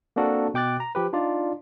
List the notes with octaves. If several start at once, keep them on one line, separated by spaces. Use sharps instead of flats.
A#3 C4 D4 F#4 A4 A#4
B2 G5 D6 F#6 A6
A#5
F3 G4 B4
D4 D#4 F4 D5